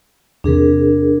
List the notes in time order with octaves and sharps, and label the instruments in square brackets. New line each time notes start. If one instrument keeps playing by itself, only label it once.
[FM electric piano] E2 C3 [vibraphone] D4 G#4 A#4